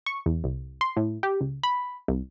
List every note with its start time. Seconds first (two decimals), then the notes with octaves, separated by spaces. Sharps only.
0.06 C#6
0.26 E2
0.44 C2
0.81 C6
0.97 A2
1.23 G4
1.41 C#2
1.63 B5
2.08 C2